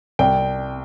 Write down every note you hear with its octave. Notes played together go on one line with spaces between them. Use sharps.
C2 G5